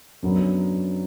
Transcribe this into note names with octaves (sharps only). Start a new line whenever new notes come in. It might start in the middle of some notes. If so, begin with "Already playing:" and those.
F#2 D3 F#3 B3